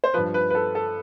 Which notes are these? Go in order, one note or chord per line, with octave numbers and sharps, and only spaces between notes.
C5
G2 F3 B4
B4
B4
A4
A4